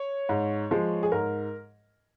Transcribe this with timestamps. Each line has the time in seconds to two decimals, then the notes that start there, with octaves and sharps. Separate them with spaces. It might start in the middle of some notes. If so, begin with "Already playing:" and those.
Already playing: C#5
0.29 G#2
0.71 F3 G#3
1.03 G#4
1.12 G#2 A#4